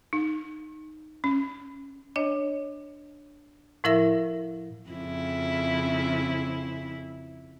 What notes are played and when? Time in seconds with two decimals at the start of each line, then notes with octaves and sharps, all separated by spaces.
0.13 D#4
1.24 C#4
2.16 D4 C#5 D#5
3.84 A2 F3 E4 A#4 E5 A#6
4.90 F2 C#3 E4